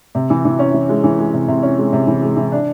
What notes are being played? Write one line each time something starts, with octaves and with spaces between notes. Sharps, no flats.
C3
E3
E3
C#4
E3
G#3
E3
G#3
C3
C3
C#4
G#3
C3
E3
G#3
E3
D4